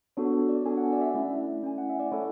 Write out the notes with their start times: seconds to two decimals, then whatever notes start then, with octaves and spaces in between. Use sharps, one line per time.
0.17 B3 D4 F#4 A4 C#5
0.34 C#5
0.49 D5
0.66 B3 D4 F#4 A4 G#5
0.77 F#5
0.93 D5
1.01 E5
1.14 A3 C#4 E4 D5
1.63 A3 C#4 E4 G#5
1.78 F#5
1.89 E5
2.00 D5
2.12 A3 E4 A4 C#5